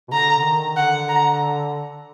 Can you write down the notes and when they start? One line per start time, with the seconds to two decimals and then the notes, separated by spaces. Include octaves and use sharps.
0.08 B2
0.12 D3 A#5
0.39 D3
0.44 D#3
0.76 D3 F#5
1.09 A#5